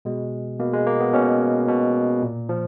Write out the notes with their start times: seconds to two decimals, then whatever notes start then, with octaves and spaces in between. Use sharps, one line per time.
0.05 B2 G#3
0.60 B2 A#3
0.74 G#3
0.87 A#3
1.00 B3
1.13 B2 C#4
1.68 B2
2.22 A#2
2.49 F3